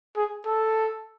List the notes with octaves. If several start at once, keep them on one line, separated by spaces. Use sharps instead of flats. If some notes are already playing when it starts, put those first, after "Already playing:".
G#4
A4